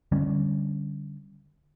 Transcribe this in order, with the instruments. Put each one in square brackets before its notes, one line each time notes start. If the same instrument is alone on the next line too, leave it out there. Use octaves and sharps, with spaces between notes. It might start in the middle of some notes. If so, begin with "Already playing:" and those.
[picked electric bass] D3 G3 C#4